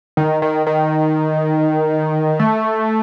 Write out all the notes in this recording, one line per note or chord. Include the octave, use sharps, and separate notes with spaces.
D#3
D#3
D#3
A3